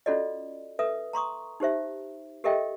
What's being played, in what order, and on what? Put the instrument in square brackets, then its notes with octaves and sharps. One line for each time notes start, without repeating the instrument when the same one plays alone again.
[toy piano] C#4 F4 F#4 A4 D5 D#5
A4 B4 E5 D#6
A#5 C6 C#6 D#6
D#4 G4 C5 E5
G4 A4 A#4 D#5 E5 G5